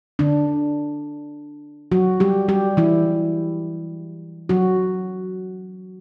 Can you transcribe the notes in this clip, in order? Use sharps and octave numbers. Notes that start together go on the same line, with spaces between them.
D3 D4
F#3 F#4
G3 G4
G3 G4
E3 E4
F#3 F#4